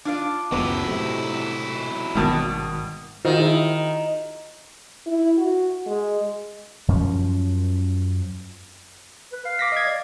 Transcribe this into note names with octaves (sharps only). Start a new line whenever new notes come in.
D4 F4 D5
C#2 F#2 F#3 B3 E4
A2 C3
G#1 G2 B2 D#3 A#4 D5 A5
D#3 F4 F#4 C5
E4 G#4
E4
F#4
G#3
F#2 F3 C#4
B4
F5
D6 A#6 B6
D#5 G#6
D5